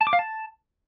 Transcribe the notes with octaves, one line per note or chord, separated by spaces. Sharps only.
A5
D6
F5
A5